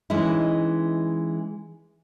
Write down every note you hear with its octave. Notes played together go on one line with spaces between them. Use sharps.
E3 G#3 C#4 D#4 E4